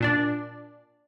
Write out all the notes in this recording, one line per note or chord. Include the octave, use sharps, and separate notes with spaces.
A#2 D4 D5